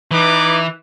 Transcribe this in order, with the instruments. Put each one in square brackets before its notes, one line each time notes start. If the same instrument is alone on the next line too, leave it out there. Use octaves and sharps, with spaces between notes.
[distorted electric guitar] E3 [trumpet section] D#4 B4 D6